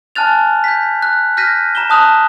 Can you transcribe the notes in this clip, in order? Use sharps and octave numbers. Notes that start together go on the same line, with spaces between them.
G#5 A5 F6 F#6 A6 F7
G6 B6
F#6
F6 G6 A#6 B6 D#7
A#5 E7 G7
A5 D#6 F#6 F7